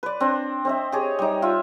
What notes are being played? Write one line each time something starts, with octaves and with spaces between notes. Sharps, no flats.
B4 D5
C4 D4
C4 D#5 E5
G4 G#4 C#5
G3 D#4
F4 E5